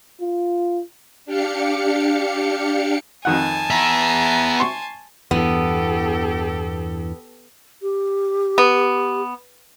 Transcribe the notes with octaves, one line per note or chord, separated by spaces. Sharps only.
F4
D4 G4 F5 C#7
F2 D#3 F#5 G#5 A5
B3 E5 A#5
C6 C#6
E2 G2 E3 B3 G4 A4
G4
B3